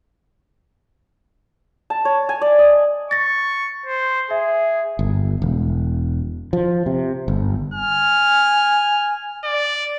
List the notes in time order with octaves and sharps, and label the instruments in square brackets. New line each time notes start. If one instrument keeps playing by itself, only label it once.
[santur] A5
C#5
G#5
D5
D#5
[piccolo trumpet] C#6 [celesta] A6 A#6
[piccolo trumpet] C5
[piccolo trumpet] G#4 [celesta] E5
[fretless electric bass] G1
E1
F3
C3
G1
[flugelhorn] G#5 [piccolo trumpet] F6
[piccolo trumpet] D5